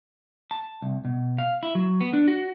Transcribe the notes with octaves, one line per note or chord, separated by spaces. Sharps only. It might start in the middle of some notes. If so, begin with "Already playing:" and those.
A5
C2
B2
F5
E4
F#3
B3
D4
F#4